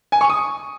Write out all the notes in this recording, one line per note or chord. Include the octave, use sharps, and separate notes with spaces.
G#5
C#6
D#6